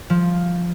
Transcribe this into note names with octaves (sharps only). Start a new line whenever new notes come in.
F3